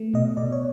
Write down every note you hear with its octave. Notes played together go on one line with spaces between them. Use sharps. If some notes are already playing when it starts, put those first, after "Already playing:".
Already playing: A3
B2 D#5
B2 D5
C#5